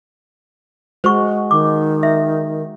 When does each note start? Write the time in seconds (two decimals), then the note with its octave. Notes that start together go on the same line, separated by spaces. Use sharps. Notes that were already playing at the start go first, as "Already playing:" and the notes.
1.04 G#3 F#4 C5 C#6
1.51 D#3 D6
2.03 E5